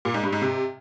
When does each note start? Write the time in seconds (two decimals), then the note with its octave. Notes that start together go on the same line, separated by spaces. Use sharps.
0.05 A#2
0.14 G#2
0.23 G2
0.32 G#2
0.42 C3